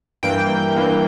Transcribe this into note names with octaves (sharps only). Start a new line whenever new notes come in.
G2 E3 A#3 G5
G2 E3 A#3